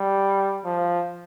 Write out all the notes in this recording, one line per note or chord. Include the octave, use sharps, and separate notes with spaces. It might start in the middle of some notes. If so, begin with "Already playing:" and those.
Already playing: G3
F3